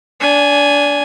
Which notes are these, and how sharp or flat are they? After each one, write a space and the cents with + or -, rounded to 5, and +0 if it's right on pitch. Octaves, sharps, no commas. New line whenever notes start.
D4 -25 G#5 +0